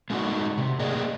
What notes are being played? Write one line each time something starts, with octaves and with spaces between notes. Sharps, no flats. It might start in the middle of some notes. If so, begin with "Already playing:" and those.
G#3 A3 C#4 D#4 F#4 F#5
C3
A3 A#3 G#4 A#4 D5 D#5